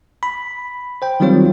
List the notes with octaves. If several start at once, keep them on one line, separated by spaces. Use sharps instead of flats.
B5
C5 G5
D#3 F#3 G3 C4 F4 C#5